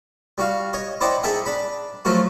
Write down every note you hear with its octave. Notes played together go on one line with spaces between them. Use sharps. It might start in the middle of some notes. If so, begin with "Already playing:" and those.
G3 F#4 F5
C#5 D#5
E4 C5 D5 D#5 F#5 G5
D#4 G#4 A4 E5 F#5 G5
D4 B5
F3 F#3 A3 F4 F#4